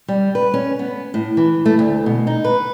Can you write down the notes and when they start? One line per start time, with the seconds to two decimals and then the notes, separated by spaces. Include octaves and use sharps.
0.08 G3
0.35 B4
0.54 C#4
0.79 B3
1.14 A2
1.37 E3
1.65 A3
1.79 D2
2.06 B2
2.27 D#4
2.44 B4